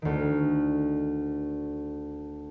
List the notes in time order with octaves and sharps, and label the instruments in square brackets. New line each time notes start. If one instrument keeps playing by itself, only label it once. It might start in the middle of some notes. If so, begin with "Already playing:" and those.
[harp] D2 D#3